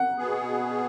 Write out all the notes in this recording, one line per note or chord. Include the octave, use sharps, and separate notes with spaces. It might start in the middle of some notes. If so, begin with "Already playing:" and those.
Already playing: F#5
B2 B3 G#4